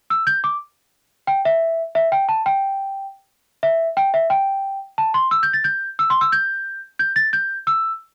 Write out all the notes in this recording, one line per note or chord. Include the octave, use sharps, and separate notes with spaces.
E6
G6
D6
G5
E5
E5
G5
A5
G5
E5
G5
E5
G5
A5
C6
E6
G6
A6
G6
E6
C6
E6
G6
G6
A6
G6
E6